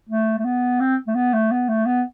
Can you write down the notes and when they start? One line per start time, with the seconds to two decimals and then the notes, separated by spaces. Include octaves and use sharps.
0.09 A3
0.39 A3
0.45 B3
0.80 C4
1.07 A3
1.15 B3
1.34 A3
1.51 B3
1.69 A3
1.86 B3